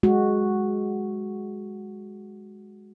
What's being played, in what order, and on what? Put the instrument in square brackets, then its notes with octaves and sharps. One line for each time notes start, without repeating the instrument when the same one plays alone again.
[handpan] G#3 F#4